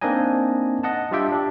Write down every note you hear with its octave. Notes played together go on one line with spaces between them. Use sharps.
A#3 C4 D4 D#4 D#5 G#5
D#5 F#5 A5
G3 D4 F4 G4 E5 G5
D4 G4